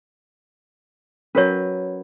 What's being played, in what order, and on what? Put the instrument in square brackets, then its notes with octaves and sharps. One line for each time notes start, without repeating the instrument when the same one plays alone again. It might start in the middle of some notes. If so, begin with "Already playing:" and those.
[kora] F#3 B4 [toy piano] C#4 A#4 C#5